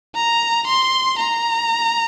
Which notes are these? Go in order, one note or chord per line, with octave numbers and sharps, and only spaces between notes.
A#5
C6
A#5